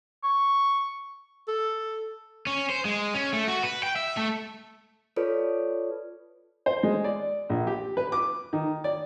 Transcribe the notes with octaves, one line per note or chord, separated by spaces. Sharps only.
C#6
A4
C#4
C5
G#3
C#4
A3
F#4
B4
G5
E5
A3
F4 A4 B4 C#5 D5
C5
G#3
D5
A#1
G4
B4
D6
D#3
D5